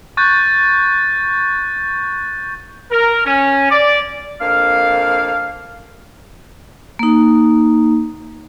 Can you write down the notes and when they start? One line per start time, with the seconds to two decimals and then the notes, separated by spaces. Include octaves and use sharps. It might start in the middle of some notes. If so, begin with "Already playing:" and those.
0.17 C#6 F#6 G6 A6
2.91 A#4
3.26 C#4
3.70 D5
4.41 F2 A#3 D4 F5
6.99 A#3 D#4